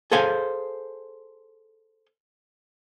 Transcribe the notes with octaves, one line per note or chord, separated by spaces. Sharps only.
G#4 A4 C5 F5 G#5